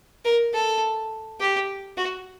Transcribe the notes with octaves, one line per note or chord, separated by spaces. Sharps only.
A#4
A4
G4
F#4